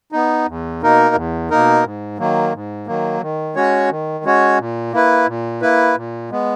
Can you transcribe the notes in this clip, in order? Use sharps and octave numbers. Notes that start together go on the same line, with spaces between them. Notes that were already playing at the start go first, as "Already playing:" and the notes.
B3 D#4
E2
B2 A#3 D#4 A#4
E2
B2 A#3 D#4 A#4
G#2
D#3 F#3 A#3
G#2
D#3 F#3 A#3
D#3
G#3 C#4 F#4 C#5
D#3
G#3 C#4 F#4 C#5
A#2
A#3 E4 B4
A#2
A#3 E4 B4
A#2
G#3 B3